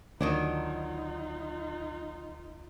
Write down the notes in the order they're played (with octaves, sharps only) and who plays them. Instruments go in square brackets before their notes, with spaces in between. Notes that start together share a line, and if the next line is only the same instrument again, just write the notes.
[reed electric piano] D2 [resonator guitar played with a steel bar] D#3 F#3 D4 [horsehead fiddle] D#4 F4